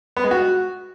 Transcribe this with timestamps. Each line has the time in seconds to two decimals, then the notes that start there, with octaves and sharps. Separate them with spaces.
0.17 B3
0.24 G#3
0.31 F#4